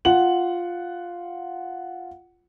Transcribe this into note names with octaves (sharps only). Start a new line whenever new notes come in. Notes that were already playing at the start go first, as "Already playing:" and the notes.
F4 F#5 F#7